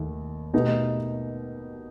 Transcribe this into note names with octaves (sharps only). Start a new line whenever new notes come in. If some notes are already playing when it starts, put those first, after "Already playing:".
Already playing: D#2 D#3 A3
B2 A3 D#4 G4 B4